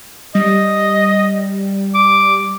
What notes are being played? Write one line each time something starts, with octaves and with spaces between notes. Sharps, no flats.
G3 D#5
D6